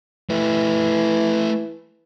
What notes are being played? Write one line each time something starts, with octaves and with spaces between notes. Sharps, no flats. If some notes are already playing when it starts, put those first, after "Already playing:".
E3 A3 G4